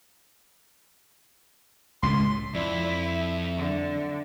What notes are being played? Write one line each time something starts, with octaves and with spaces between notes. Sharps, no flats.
C#2 A2 C6
F2 E4 D5
E5
D3